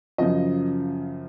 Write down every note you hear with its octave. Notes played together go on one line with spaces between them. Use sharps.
F#2 C#3 F3 D#5